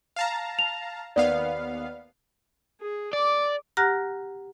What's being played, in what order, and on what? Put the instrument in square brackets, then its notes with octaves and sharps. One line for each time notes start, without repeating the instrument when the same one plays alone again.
[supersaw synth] F5 A5 A#5
[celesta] F7
[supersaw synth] D#2 B3 F5 [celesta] D5
[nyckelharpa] G#4
[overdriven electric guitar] D5 [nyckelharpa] D6
[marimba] G4 F#5 A#5 F6 F#6 A#6